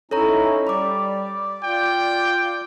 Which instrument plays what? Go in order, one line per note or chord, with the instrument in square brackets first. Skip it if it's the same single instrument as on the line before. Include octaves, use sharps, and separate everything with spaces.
[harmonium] C#4 D#4 [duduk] E4 [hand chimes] A4 C#5 A#5
[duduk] G3 [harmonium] D5 [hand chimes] B5 D6
[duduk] F4 [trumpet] G5